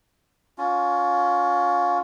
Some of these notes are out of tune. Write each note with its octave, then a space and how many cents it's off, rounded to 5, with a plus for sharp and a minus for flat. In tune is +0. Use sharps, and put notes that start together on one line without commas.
C#4 +20 F4 +25